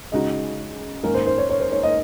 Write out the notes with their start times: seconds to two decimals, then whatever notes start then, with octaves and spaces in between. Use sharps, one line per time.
0.12 C#3 G#3 D#4 F#4 D#5
1.03 G#2 D#3 A#3 C#4 A#4
1.14 C5
1.26 C5
1.38 C#5
1.49 C#5
1.60 C5
1.72 C#5
1.83 D#5